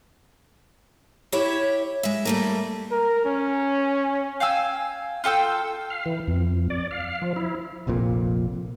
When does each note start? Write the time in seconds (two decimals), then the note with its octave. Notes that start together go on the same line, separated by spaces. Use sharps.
1.32 E4 G4 C#5 E5
2.03 G#3 E5
2.25 G3 A3 A#3
2.92 A#4
3.25 C#4
4.40 F5 G5 G#5 E6
5.24 F4 A4 G5 E6
5.90 F5
6.06 E3
6.28 F2
6.70 D5
6.91 F5
7.22 F3
7.36 E4
7.87 F1 A#1 F2 A#2